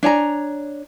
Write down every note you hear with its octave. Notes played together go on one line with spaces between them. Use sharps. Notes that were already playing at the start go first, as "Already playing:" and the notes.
D4 C#5 G#5 A#5